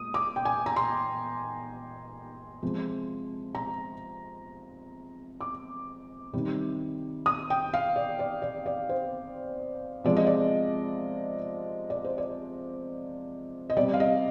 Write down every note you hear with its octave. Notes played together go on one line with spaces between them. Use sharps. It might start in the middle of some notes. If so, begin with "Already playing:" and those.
Already playing: A#2 G#3 D#6
D6
G5
G#5
A#5
C6
C3 F3 G#3
A#5
D6
C3 D#3 G3
D#6
G5
F5
D5
D5
D5
D5
C5
C3 F3 G#3 D5
D#5
D5
D5
C5
D5
D#5
C3 G3 D5
F5
D#5